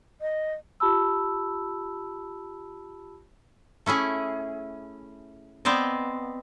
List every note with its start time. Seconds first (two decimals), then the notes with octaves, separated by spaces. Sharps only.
0.21 D#5
0.80 F4 G4 A5 B5 E6
3.86 A3 C#4 E4 G#4
5.65 B3 C4 C5 D5 D#5